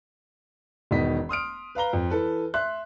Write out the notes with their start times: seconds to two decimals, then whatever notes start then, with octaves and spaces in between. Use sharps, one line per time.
0.91 E1 D#3 B3 D#5 B6
1.29 C6 D#6 F6 D7
1.75 B4 F5 A#5 G7
1.93 F2
2.10 E3 A4 B4
2.54 E5 C6 F#6